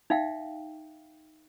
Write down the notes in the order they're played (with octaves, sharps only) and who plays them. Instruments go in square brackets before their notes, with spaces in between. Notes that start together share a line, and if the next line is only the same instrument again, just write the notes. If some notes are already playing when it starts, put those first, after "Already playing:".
[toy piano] D#4 E5 F5 G5